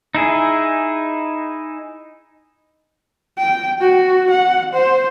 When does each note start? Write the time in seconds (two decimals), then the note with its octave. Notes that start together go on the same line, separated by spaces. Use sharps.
0.15 D#4 E4 G#4
3.38 G5
3.81 F#4
4.31 F#5
4.74 C5